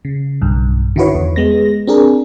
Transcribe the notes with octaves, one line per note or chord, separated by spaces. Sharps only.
C#3
B1 G2
D3 D#3 E4 F#4 B4 C#5
E2
G#3 B3 A#6
C4 D4 G#4 A#4